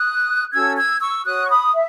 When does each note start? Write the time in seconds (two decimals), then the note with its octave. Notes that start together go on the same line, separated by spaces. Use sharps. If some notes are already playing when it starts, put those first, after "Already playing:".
Already playing: D#6 F#6
0.53 C#4 F#4 A4 E6 G#6
0.77 E6 G#6
1.01 C#6 E6
1.25 F#4 C#5 D#6 F#6
1.45 C#6
1.49 B5 D#6
1.73 E5